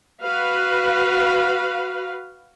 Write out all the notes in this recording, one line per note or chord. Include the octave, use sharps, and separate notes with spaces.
F#4 B4 F5